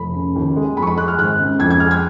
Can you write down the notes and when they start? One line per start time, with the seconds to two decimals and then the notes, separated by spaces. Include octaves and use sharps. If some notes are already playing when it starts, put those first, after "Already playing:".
Already playing: F1 B5
0.14 C#3
0.36 D#2
0.56 G#3
0.77 F2 B5
0.82 C#6
0.87 B5
0.97 G#3 F#6
1.08 F6
1.18 G#1 F#6
1.38 C#3
1.59 F2 G#6
1.70 G#6
1.80 G#3 F6
1.91 G#6